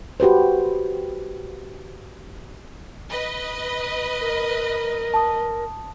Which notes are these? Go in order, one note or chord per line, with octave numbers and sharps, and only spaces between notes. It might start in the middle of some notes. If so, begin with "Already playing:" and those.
F#4 G4 B4 C5
B4 D#5
A#4
A5 D#6